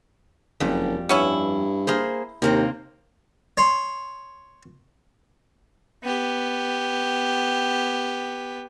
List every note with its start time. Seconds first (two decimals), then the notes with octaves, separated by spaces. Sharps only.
0.60 F#1 F2 G3
1.09 G2 B3 C#4 E4
1.87 A#3 G#4 C5
2.42 D#2 C3 A#3 C4
3.57 C#5 C6
6.04 B3 G4